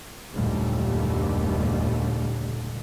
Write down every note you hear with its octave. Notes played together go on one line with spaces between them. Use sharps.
F#1 D#2 A#2 D3 G3 A3